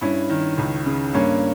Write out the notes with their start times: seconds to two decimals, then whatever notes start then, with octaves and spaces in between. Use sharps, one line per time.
0.01 G2 C#4 E4
0.30 D#3
0.58 C#2
0.86 C#3
1.14 G2 A#3 C#4